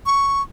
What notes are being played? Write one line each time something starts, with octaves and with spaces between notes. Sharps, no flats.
C#6